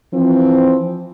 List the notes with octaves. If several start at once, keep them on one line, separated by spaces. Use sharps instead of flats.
E3 F3 C4